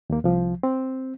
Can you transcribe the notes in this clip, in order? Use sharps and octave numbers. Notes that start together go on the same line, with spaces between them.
D#2 A#3
C2 F3
C4